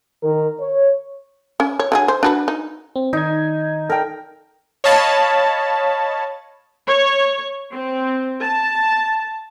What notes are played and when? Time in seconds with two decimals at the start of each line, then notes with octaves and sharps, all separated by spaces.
0.23 D#3 A#4
0.60 C#5
1.60 C#4
1.79 C#5
1.92 D3 F#3 G#4
2.08 C5
2.23 D4 F#4 B4
2.48 D#4
2.96 C4
3.13 D#3 D#4 G#6
3.90 A4 A#4 G5
4.84 C#5 D#5 F5 A5 B5 A6
6.87 C#5
7.71 C4
8.43 A5